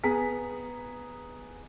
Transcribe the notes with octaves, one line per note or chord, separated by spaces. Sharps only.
B3 G#4 A#5 B6